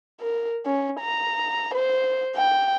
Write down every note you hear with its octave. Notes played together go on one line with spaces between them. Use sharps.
A#4
C#4
A#5
C5
G5